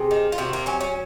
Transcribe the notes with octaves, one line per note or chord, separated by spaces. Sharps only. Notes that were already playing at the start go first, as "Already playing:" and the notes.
Already playing: C3 G#4
D#3
F4
C3 F#4
A#3
F#3 C#4
C#4